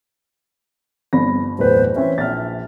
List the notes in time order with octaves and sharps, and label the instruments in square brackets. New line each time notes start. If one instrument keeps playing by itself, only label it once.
[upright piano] G1 C4 B5 [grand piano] A#6
[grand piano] D1 E2 B4 [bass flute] C5
[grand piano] E3 C4 C#4 [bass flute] E5
[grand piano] A#1 [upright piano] F6 A6